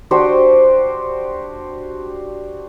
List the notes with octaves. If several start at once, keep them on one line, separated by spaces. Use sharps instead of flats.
D4 F#4 G4 C5